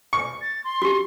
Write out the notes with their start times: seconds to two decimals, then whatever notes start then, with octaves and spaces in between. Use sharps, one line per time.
0.13 C#6
0.41 A6
0.64 C6
0.82 F#4 G4